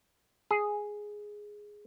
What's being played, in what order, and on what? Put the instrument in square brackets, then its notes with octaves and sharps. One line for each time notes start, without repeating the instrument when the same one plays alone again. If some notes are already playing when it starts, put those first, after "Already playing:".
[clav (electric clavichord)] G#4